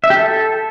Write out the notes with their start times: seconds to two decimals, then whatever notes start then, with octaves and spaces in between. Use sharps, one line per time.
0.04 E5
0.10 G4
0.17 A4